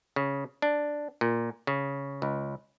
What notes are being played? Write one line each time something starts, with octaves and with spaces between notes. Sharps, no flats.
C#3
D4
A#2
C#3
C#2